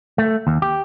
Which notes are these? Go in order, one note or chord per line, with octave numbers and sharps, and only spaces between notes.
A3
D#2
G4